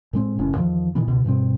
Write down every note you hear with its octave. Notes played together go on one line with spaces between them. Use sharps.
A2 G#3 C4
F#1 A2 C#4
E2 D#3 F3
A#2 D#3 E3 B3
C#2 B2
G2 B2 G3 C4